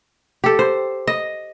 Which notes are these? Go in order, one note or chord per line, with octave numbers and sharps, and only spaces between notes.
G4 A4
C5
D#5